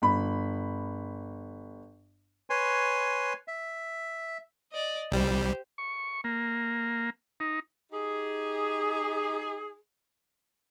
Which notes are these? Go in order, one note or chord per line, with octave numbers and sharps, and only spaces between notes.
G1 B5
B4 C#5 G#5 C6
E5
D5 D#5
C2 G3 G4 C5
C#6
A#3
D#4
D#4 G4 G#4